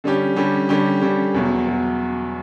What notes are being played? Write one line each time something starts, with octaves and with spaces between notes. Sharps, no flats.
D3 G3 C#4 G4
D3 G3 C#4 G4
D3 G3 C#4 G4
D3 G3 C#4 G4
E2 B2 F#3
B2 F#3